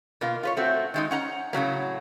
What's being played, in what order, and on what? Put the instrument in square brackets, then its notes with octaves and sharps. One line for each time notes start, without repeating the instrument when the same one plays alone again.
[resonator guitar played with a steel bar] B2 A#3 F4
F4 B4 C#5
A3 C4 F#4
D#3 G#3 D#4
C#4 F#5 A#5
A2 C#3 F#3 A#3